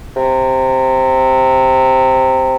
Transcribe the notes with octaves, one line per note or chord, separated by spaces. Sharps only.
C3